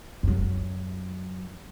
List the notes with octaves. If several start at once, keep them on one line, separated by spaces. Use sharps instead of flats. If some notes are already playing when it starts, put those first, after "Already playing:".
F#2 F#3